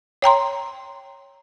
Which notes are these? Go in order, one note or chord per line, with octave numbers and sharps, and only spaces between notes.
C#5 G5 A#5 C6